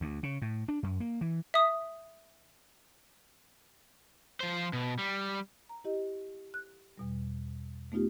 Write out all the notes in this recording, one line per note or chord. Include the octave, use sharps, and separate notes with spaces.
D2
C#3
A2
D4
F#2
A#3
E3
E5 D#6
F3 C5
B2
G3
A#5
E4 G4 D#5
F#6
E2 B2 G3
A3 B3 D#4 F4 G4